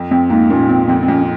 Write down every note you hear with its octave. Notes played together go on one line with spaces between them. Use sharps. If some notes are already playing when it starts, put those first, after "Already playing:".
Already playing: F2
F2 C4
G#2 A#3
A#2 C#4
C4
F2 C4
C4
F2 C#4